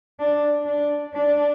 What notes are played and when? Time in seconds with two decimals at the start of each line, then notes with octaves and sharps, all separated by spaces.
0.20 D4
0.66 D4
1.14 D4